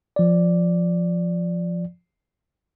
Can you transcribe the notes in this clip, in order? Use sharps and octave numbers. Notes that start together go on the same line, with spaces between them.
F3 D5